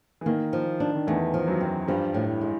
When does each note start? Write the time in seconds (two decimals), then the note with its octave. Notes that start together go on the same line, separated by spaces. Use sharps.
0.21 E3
0.26 D#3 A#3
0.53 F3
0.80 D4
0.95 D#3
1.07 E2 E3 A3
1.34 F3
1.47 F#2 F#3
1.61 C4
1.88 G2 F3 G3
2.14 A2
2.41 G#3